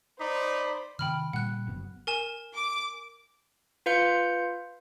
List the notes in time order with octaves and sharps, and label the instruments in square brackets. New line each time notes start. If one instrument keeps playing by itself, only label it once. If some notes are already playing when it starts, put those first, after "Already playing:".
[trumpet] D#4 [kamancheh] C5 [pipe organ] D5 B5
[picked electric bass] C3 D#3 [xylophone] G5 B5 F6
[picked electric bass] A#2 D3 G3 [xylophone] F#5 F#6
[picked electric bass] F#1 F#3 B3
[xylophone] A#4 G#5 E7
[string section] D6
[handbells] F4 B4 F5 G6 C#7